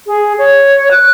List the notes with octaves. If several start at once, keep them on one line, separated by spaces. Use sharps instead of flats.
G#4
C#5
F#6